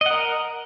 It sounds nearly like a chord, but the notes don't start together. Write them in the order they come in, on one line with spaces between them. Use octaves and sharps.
D#5 F#5 A#4